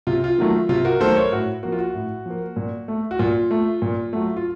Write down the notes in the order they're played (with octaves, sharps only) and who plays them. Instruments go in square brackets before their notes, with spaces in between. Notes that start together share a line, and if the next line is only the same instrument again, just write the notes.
[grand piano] C3 F4
F4
D#3 F#3 A3
C3 F4
F#4 A#4
D#3 F#3 A3 A4 C5
A#4 C#5
A2 F#4
F3 A#3 F#4
F4
F#4
A2
F3 A#3
A#2
A3
F#4
A#2 F4
A3
A#2
F#3 A3
F4